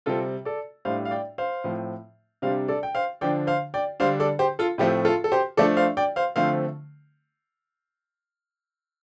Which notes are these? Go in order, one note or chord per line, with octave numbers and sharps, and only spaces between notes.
C3 G3 C4 F4 A4
A4 D5
A2 G3 D4 C5 F5
F5
D5 G5
C5 F5
A2 F3 C4
C3 G3 D4 C5 F5
A4 D5
G5
C5 F5
D3 F3 D4 D5 G5
C5 F5
D5 G5
D3 G3 D4 C5 F5
A4 D5
G4 C5
F4 A4
A2 F3 A3 C4 G4
F4 A4
A4
G4 C5
F3 A3 D4 A4 D5
C5 F5
D5 G5
C5 F5
D3 F3 A3 C4 C5 F5